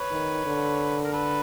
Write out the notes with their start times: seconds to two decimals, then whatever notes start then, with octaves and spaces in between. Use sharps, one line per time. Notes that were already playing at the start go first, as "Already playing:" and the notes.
Already playing: B4 C#5
0.11 D#3
0.46 D3
1.04 A#4
1.13 A4 B4